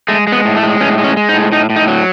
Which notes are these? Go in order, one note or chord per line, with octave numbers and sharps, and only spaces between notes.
G#3 A3
G#3 B3
A2
A3
G#3
A2 C#4
G#3
C#4
G#3
D#4
A2
A2 D#4
A2
D#4
F#3